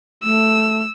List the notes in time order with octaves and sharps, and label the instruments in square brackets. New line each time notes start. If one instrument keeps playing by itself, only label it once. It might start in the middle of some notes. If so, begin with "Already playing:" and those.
[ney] A3 [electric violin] E6